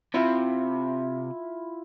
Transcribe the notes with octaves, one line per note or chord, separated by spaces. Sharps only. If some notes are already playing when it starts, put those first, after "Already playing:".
C3 E4 F4